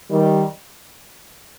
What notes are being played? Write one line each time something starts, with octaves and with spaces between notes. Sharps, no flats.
D#3 G3